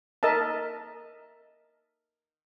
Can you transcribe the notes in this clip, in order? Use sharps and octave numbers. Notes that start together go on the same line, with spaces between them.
A#4 D#5 E5 A5